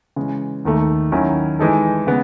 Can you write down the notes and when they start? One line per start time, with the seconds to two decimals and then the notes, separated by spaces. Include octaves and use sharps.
0.16 C#3 E3 G#3
0.65 D#2 D#3 A3
1.12 D#3 F#3 C#4 E4
1.59 E3 G#3 D#4 A4
2.07 C#3 G#3 B3